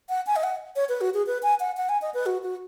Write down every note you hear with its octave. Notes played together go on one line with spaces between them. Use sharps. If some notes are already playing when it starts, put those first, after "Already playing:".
F#5
G#5
D#5
F#5
C#5
B4
F#4
G#4
B4
G#5
F#5
F#5
G#5
D#5
B4
F#4
F#4